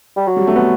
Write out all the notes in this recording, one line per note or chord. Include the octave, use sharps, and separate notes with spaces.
G3
F#3
G3
A3
B3